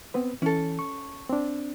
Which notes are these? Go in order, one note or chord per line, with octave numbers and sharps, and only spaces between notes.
B3 C4 B4
E3 C#4 A4
C#6
C4 D4